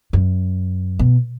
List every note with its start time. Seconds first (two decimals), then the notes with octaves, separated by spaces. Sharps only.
0.13 F#2
0.99 B2